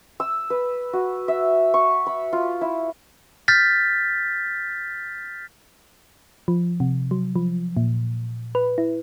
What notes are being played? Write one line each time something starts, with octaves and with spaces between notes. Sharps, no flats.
E6
B4
F#4
E5
C#6
B5
F4
E4
F6 G6 A6 B6
F3
C3
F#3
F3
A#2
B4
E4